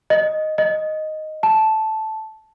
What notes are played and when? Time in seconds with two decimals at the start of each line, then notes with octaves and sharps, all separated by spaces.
0.10 D#5
0.58 D#5
1.43 A5